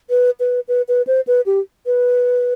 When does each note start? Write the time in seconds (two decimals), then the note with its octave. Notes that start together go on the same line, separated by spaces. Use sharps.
0.10 B4
0.40 B4
0.68 B4
0.88 B4
1.07 C5
1.27 B4
1.46 G4
1.86 B4